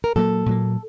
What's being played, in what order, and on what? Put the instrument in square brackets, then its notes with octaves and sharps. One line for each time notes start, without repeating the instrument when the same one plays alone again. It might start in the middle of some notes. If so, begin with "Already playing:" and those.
[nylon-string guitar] A#4
[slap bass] A#2 F#3 A#3 [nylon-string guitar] A4
[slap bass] A#2 F#3 A#3